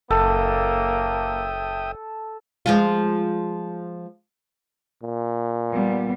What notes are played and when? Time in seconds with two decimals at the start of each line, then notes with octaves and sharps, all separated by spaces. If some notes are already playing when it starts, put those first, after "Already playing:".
0.11 F#1 A#3 A4 E5 G5 D#6
2.66 F3 G#3 F4
5.03 A#2
5.71 G3 B3